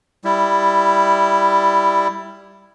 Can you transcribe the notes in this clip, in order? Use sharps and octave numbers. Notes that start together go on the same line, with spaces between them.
G3 E4